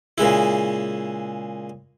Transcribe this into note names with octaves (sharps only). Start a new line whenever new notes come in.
A#2 C#3 G#3 E4